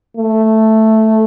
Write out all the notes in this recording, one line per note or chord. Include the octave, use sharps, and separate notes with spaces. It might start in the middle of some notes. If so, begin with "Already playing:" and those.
A3